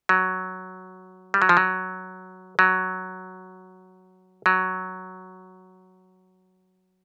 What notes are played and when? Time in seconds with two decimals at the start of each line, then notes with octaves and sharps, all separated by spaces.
0.09 F#3
1.34 G3
1.42 F#3
1.49 F3
1.57 F#3
2.59 F#3
4.46 F#3